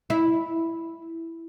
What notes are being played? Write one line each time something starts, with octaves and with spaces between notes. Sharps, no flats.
E4